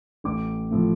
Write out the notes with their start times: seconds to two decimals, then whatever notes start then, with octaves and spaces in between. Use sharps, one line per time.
0.24 A1 D6
0.71 A2 F3